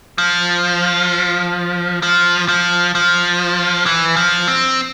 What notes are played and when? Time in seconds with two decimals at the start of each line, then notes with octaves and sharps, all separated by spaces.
0.18 F3
2.03 F3
2.48 F3
2.95 F3
3.86 E3
4.16 F3
4.48 C4